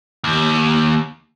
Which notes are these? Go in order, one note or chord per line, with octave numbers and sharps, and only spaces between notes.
D#2